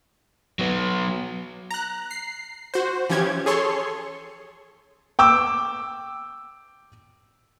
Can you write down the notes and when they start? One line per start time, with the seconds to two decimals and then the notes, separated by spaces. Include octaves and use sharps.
0.59 F#3 B3
1.71 A#5 F#6
2.11 C7
2.74 F#4 C5
3.09 E3 F3 C#4 G4 G#6
3.46 G#4 A4 C#5 C6 C#6
5.19 G5 D6 E6